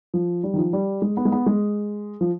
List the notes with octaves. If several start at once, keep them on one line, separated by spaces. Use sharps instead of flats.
F3
G3
D#3
F3
G3
G#3
B3
G#3
B3
G#3
F3